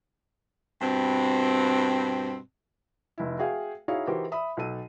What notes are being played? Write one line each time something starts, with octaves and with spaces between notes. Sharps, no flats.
G2 B2 C4
F1 E4
F#4 G#4 E5 F5 G5 G#5
D#4 E4 F#4 G#4 C#5 F5
E3 D#4 F#4 G4 A#4 C5
E5 B5 D#6
B1 A4 D#7